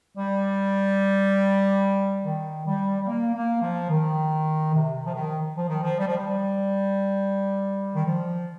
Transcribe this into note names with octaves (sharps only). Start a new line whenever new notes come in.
G3
D#3
G3
G3
A#3
A#3
F3
D#3
C3
C3
F3
D#3
F3
D#3
F3
G3
F3
G3
D#3
F3